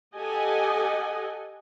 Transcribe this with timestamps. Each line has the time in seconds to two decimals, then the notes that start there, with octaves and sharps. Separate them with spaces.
0.15 G4 A4 D#5 F#5 G#5